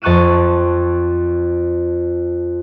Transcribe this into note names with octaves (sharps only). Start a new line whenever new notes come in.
F2 A5 C#6 F#6 D#7 E7